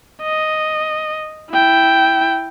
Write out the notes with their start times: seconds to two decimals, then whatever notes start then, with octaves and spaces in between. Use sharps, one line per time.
0.22 D#5
1.50 E4 G5